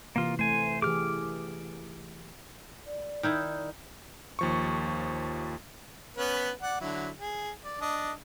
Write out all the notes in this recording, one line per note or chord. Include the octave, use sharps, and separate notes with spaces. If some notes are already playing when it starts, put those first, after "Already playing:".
C3 E3 A#3 F4
A3 C5 G#5
E3 G4 G#4 D6 F6
D5
D#3 D#4 E4
D#2 F3 C#6
B3 C#4 B4
D5 F#5
D3 F#3 E4
G#4
D5
D4 D#5